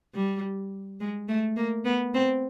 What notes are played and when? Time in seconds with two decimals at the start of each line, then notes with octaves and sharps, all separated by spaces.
0.15 G3
1.00 G#3
1.28 A3
1.57 A#3
1.85 B3
2.14 C4